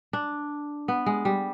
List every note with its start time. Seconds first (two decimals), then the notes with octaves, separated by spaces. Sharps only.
0.13 D4
0.88 B3
1.06 G#3
1.25 G3